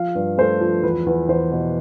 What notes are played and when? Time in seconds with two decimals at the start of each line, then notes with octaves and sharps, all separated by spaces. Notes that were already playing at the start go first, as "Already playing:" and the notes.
Already playing: F3 F5
0.15 G2
0.38 A3 C5
0.61 F3
0.83 E2 B4
1.06 E2
1.28 E2 C5
1.51 B2